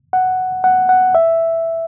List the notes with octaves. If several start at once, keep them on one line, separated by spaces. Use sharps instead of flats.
F#5
F#5
F#5
E5